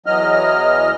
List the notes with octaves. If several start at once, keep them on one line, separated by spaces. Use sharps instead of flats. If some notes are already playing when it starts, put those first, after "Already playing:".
E2 E3 F#3 D#5 F6